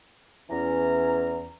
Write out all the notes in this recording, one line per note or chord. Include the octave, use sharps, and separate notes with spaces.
E2 E3 C#4 A#5